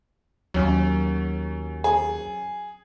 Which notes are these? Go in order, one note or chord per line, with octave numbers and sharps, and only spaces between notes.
D#2 F#3 C#4
G#4